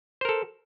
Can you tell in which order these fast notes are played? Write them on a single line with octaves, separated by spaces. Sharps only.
C5 A#4 A4